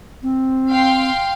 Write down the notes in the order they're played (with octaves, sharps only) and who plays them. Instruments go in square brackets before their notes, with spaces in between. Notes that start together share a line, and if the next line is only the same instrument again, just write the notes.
[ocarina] C4
[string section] F5 G5 C6